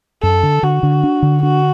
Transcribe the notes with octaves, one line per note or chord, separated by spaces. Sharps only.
F#2 A4
D3
D3 F#4
D3
D4
D3
D4 F#4